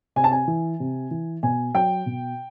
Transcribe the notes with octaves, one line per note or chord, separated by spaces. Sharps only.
C3 G#5
A5
G#5
E3
C3
E3
B2 G#5
F#3 G5
B2